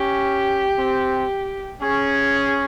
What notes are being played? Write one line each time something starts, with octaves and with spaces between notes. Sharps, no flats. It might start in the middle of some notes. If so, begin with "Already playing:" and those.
Already playing: C#4 G4
C4
C#4 G#4